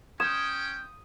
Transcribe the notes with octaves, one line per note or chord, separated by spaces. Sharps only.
C#4 G5 D#6 G#6 E7